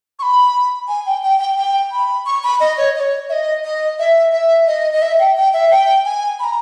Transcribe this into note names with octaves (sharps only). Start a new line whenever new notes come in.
C#6
B5
G#5
G5
G5
G5
G5
B5
C#6
B5
D#5
C#5
D#5
C#5
E5
D#5
D#5
E5
E5
D#5
D#5
E5
G5
G5
E5
G5
G#5
B5
A#5